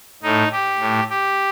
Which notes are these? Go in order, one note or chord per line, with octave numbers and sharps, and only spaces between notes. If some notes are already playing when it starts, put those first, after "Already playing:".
A2 D#4
G4
A2
G4